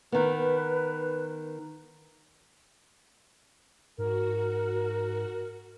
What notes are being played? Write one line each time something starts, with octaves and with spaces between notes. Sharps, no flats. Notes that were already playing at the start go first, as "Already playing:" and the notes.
D#3 B3 B4
G#2 F#4 A#4